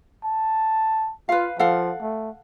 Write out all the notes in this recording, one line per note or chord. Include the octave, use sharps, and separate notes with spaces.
A5
F4 B4 F5
F3 A4 F5 F#5
A3